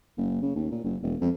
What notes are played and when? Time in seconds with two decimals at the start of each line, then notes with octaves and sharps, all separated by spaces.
0.17 F#1
0.42 C#3
0.56 D#2
0.71 A#2
0.84 F#1
1.02 E1
1.21 F2